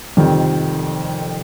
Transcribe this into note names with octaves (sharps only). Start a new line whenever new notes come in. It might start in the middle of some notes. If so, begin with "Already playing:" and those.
F1 F2 D#3 G3 C4